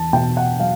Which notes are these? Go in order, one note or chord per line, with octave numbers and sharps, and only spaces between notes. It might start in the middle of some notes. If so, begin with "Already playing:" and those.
Already playing: E2 A5
B2 G5
F#5
F#3 F5